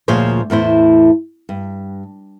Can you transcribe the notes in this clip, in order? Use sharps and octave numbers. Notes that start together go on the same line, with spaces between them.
D2 A#2 F3 G#4 C5 C#5
E2 A2 E4 C5
G2